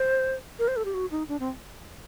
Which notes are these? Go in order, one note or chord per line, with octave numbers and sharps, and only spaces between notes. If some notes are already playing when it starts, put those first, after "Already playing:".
Already playing: C5
A#4
C5
A4
G4
F#4
D#4
D4
C4